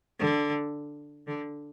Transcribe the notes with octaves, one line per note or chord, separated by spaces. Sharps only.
D3
D3